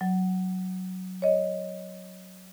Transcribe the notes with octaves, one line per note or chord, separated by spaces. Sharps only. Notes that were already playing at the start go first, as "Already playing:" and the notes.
F#3
C#5 D#5